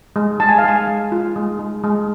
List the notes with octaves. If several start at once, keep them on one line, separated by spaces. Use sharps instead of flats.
G#3
G#3 A5
G#5
F5
G#3 G#5
G#3
F4
G#3
G#3
G#3